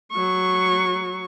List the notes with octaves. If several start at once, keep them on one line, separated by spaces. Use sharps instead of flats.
F#3 C#6